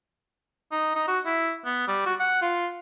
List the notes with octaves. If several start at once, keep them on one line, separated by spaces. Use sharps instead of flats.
D#4
D#4
F#4
E4
B3
G3
F#4
F#5
F4